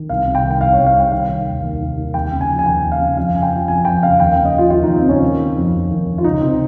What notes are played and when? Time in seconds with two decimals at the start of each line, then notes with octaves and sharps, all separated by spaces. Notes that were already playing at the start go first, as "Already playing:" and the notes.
Already playing: D#3
0.09 C2 F5
0.27 C3
0.35 G5
0.44 D#3
0.51 G5
0.61 C2 F5
0.73 C2 C#5
0.87 F5
0.95 C3 G5
1.12 D#3 F5
1.29 D#3
1.47 D#2
1.63 D#2
1.80 D#3
1.97 D#3
2.14 D#2 G5
2.32 C#3
2.41 G#5
2.48 F3
2.59 G#5
2.66 D#2 G5
2.83 D#2
2.92 F5
3.00 C#3
3.17 F2 F5
3.35 C#3 G#5
3.42 G5
3.51 F3
3.68 F2 G#5
3.85 F2 G5
4.02 C#3 F5
4.20 D#2 G5
4.32 C#3 F5
4.45 D#5
4.54 F3 F4
4.70 D#2 F4
4.83 D#2 D#4
4.96 C4
5.05 C#3 C#4
5.22 D#3
5.39 D#3
5.56 F2
5.73 F2
5.91 D#3
6.07 D#3
6.18 F4
6.24 C#2 D#4
6.41 C3 C4